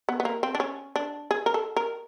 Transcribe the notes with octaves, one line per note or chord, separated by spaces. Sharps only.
B3
B3
A#3
C4
D4
C#4
D4
G#4
A#4
A4
A#4